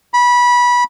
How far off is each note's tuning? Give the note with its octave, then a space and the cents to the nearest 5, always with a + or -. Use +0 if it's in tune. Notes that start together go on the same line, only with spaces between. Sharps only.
B5 -20